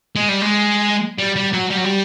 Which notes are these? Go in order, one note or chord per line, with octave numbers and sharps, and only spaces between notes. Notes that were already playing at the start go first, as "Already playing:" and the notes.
G#3
G3
G#3
G3
G3
F#3
G3
F#3
G3